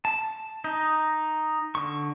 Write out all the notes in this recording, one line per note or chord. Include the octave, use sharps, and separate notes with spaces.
A5
D#4
D3 C#6